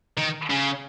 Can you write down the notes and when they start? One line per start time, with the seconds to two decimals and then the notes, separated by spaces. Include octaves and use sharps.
0.18 D#3
0.50 C#3